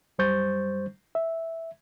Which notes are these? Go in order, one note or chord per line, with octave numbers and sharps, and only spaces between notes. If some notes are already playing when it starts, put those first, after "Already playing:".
F#2 G3 C5 C#6 G6 A6
E5